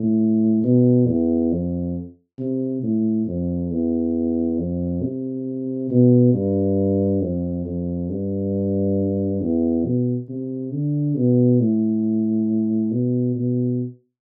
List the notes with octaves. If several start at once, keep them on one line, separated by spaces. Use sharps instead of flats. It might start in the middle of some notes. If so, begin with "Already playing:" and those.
Already playing: A2
B2
E2
F2
C3
A2
F2
E2
F2
C3
B2
G2
F2
F2
G2
E2
B2
C3
D3
B2
A2
B2
B2